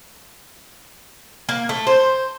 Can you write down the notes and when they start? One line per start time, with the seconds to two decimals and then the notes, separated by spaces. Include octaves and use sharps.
1.49 A#3
1.69 A3
1.87 C5